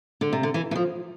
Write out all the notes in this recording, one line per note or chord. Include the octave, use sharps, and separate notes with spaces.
D3
C3
D3
E3
E3
F3